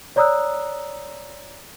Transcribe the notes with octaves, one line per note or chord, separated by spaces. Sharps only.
C#5 D5 A#5 D#6 E6 F#6